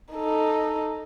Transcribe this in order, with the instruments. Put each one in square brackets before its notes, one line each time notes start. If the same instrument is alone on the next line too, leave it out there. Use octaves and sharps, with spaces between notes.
[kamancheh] D#4 A4